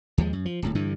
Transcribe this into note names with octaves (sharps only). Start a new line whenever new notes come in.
D#2 F3 G#3
F#2
F3
D1 F2 A2
G2 D3 E3